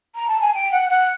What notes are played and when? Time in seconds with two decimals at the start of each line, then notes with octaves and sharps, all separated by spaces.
0.15 A#5
0.28 A5
0.41 G#5
0.54 G5
0.72 F#5
0.90 F#5